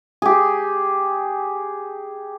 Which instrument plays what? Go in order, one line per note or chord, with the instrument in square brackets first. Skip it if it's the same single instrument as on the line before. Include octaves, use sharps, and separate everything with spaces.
[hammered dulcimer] G4 G#4